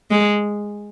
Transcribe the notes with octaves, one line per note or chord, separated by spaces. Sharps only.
G#3